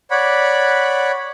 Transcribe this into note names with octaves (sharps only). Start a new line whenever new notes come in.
C#5 D5 F#5 B5